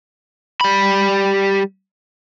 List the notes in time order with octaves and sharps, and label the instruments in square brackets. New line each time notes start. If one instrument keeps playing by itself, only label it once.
[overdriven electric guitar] G3 B5